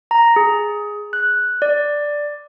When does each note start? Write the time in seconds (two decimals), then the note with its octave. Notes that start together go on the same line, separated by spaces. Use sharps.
0.11 A#5
0.36 G#4
1.13 F#6
1.62 D5